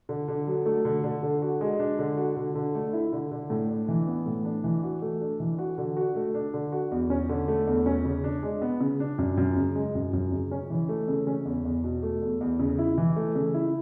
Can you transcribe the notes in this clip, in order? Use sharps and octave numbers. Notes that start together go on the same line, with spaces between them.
D3
D3
F#3
A3
D3
D3
D3
F#4
G#3
D4
D3
F#4
D3
D3
A3
E4
D3
D3
A2
D4
E3
B3
A2
D4
E3
F#4
A3
D4
E3
F#4
D3
F#4
A3
D4
D3
F#4
E2
C#4
D3
A3
E2
C#4
C#3
D4
G#3
B3
C#3
D4
F#2
F#2
C#3
G#3
F#2
F#2
C#3
C#4
E3
A3
C#3
C#4
E2
E2
B2
A3
E2
E2
C#3
E4
E3
A3
C#3
E4